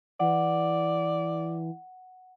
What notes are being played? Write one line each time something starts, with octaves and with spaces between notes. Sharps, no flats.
E3 D5 F#5